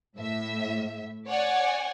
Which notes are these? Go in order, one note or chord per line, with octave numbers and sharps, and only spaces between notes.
A2 E5
C#5 D5 F#5 G#5